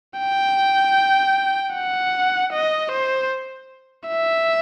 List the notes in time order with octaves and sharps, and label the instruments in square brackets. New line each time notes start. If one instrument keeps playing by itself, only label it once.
[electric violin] G5
F#5
D#5
C5
E5